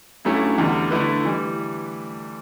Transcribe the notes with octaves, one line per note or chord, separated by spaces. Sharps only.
G2 F#3 A3 C#4 E4
E2 D3 G3
D3 A3 E4 B4
E3 G3